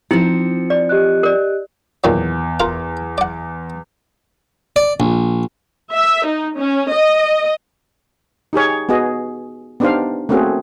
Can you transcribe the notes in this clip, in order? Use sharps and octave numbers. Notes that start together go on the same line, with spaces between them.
F3 C4 D#4 E4 C#7
D5
G4 D#5 F#6
A#4 D5
E2 A#2 D#3 F#3
F4 A#4 A#5
D5 F#5
D5
A#1
E5
D#4
C#4
D#5
D#4 G4 G#4 C#5
B3 F#4 G#4 D#5
B3 D4 D#4 G4 C5 F5
A3 A#3 C4 C#4 F#4 G#4